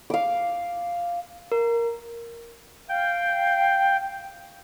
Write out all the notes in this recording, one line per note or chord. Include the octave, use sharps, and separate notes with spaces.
F5 D6
A#4
F5 G5